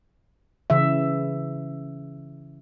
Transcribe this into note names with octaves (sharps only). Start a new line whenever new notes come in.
C#3 E3 E5